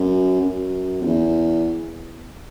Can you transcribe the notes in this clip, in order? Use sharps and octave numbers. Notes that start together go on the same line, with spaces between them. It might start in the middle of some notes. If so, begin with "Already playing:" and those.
Already playing: F#2
F#2
F2
E2